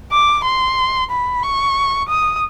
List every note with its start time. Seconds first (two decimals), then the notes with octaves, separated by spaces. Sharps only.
0.12 D6
0.45 C6
1.11 B5
1.44 C#6
2.09 D#6